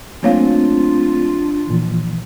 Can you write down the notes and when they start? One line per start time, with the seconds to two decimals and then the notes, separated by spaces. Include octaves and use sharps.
0.23 F#3 A3 A#3 C4 D4 F4 C#5 F5
1.67 A#2 E3 F3